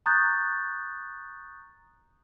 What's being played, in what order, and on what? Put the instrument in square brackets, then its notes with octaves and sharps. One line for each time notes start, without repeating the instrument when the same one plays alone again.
[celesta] A#5 C#6 D#6 F#6 G6 A6